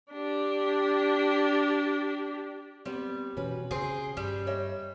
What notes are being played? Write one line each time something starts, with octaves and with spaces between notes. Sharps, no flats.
D4 G4
G3 B3 C4
B2 E3 C#4 F#4 B4
C#3 C4 G#4
G2 G3
C#5 D#5 E5